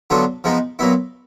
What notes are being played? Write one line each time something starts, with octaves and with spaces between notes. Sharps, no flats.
D3 F#3 B3 D4 F4
F3 G#3 B3 D#4
A#2 F#3 B3 E4